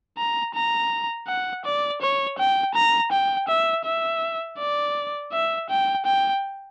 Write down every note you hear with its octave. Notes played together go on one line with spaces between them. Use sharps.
A#5
A#5
F#5
D5
C#5
G5
A#5
G5
E5
E5
D5
E5
G5
G5